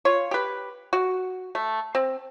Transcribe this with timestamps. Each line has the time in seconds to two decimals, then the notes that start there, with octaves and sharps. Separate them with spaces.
0.05 F4 C#5
0.31 G4 B4
0.93 F#4
1.55 A3
1.95 C4